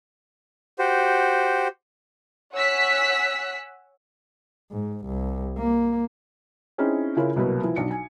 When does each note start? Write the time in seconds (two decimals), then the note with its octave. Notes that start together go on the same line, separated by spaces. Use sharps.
0.79 F#4 G4 C5
2.53 C#5 F#5 G#5 E6 F#6 B6
4.71 G#2
5.06 C2
5.57 A#3
6.78 C4 C#4 D#4 E4 G#4
7.17 C#3 E4 F4 A#4 C#5
7.36 C2 B2 F#3 A#3 B4
7.63 E3 F3
7.76 B1 D4 C#7
7.91 G#5